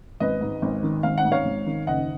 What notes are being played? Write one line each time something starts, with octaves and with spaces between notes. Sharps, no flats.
G#1 B4 D#5
G#2
G#1
D#3
G#1 F5
F#5
G#2
C#5 F5
G#1
D#3
F#1 D#5 F#5